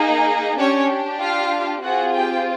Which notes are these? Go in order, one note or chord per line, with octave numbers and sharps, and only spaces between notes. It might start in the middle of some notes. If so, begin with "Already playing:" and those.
Already playing: A#3 D#4 G#4
C#4 D4 G4 C#5
F4 F5
C4 F4 F#4 G#4 F#5
G4 G5